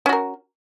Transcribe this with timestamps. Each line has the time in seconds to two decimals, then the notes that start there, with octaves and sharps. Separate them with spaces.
0.06 C#4
0.09 F#4
0.13 A#4